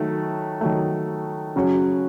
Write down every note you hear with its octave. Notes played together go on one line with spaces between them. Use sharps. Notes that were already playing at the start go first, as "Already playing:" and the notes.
Already playing: D#3 F#3 A3
D#3 F#3 A3
C#3 F#3 C#4 F#4